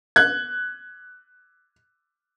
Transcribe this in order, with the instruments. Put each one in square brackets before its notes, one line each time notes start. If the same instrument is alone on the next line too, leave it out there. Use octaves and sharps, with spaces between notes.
[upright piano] F#6 G#6